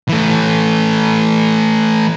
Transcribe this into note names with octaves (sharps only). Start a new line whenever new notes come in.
E3 A3